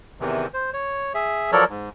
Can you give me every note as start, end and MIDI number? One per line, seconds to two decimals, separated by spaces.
0.20 0.47 40
0.20 0.47 48
0.20 0.47 51
0.20 0.47 52
0.54 0.70 72
0.74 1.13 73
1.14 1.51 68
1.14 1.51 76
1.52 1.64 53
1.52 1.64 54
1.52 1.64 69
1.52 1.64 70
1.52 1.64 73
1.52 1.64 74
1.69 1.89 44